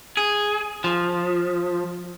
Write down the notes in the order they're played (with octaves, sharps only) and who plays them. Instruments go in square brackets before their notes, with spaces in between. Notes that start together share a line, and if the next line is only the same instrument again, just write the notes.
[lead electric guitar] G#4
F3